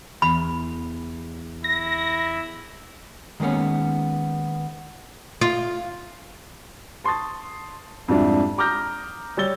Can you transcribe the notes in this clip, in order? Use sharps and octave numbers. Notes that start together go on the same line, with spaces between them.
E2 B5
E4 A#6
D#3 G#3 A#3 B3 C#4
F4
A5 C6 C#6 D#6 A6
F2 G#2 G3 D4 E4
A#5 D6 D#6 F6 G6 A#6
G3 C#5 E6 A6 G7